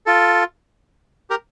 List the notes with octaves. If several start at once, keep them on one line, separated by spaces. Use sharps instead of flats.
F4 A4
G4 A#4